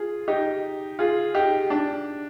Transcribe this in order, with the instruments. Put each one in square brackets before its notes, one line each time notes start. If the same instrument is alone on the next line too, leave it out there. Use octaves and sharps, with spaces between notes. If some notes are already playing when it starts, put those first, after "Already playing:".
Already playing: [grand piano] F4 G#4
D#4 G4
F4 G#4
D#4 G4
D4